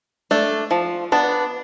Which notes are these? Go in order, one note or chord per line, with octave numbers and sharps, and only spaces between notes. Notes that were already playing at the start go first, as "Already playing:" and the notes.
A3 D4
F3
B3 D4